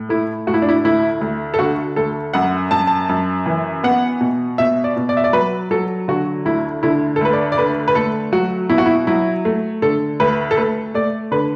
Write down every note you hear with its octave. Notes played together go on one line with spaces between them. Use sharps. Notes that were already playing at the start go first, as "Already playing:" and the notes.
Already playing: A2
A3 E4
A2 F#4
E4
D4
E4
D2 E4
D2
A4
D3 F#4
D2 A4
F#2 F#5
F#2 A5
A5
F#2
E3
B3 F#5
B2
B2 E5
D5
B2
D5
E5
D5
F#3 B4
F#3 A4
D3 F#4
D2 E4
D3 E4
A4
D2 B4
D5
D5
D3 B4
B4
A3 A4
F#3 F#4
B2 E4
F#4
E4
F#3 E4
A3
D3 A4
D2 B4
A4
A3 B4
A3 D5
D3 B4